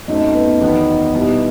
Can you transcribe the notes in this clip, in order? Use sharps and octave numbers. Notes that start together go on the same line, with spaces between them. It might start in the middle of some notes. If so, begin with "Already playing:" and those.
F#2 F#3 A3 C4 D#4 D#5
B3 B4
E2 D#3 F#3 B3 D#4
B2 G3 B3 E4 G4